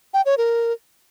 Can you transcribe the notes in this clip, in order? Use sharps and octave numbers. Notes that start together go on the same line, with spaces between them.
G5
C#5
A#4